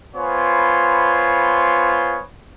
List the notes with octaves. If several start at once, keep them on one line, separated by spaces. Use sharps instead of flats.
B3 F4 C5 C#5 G#5 B5